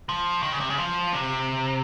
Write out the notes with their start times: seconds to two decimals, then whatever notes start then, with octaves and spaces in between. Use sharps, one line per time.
0.09 F3
0.43 D#3
0.52 C#3
0.60 C3
0.70 C#3
0.78 F3
1.13 C3